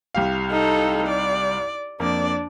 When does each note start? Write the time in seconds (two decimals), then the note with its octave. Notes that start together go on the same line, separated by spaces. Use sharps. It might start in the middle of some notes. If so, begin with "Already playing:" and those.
0.15 C2 G4 F5
0.50 D#4 A4
1.07 D5
2.00 F2 A#3 D4 D5